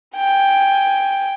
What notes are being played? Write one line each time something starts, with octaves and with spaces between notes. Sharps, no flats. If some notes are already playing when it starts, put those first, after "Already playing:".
G5 G#5